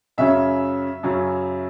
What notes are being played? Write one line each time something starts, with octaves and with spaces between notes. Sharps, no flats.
F#2 C#3 F#3 C#4 E5
F#2 C#3 F#3 C#4